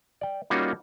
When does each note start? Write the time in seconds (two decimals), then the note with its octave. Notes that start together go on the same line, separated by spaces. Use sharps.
0.21 D5 G5
0.50 G3 A#3 C#4 D#4 F4 F#4